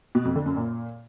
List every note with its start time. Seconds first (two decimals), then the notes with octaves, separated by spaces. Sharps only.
0.15 B2
0.25 F2
0.36 D3
0.46 F#2
0.56 A#2